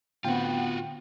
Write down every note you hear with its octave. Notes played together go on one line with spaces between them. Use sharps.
A2 D3 B3 C4 F4 F#4 G5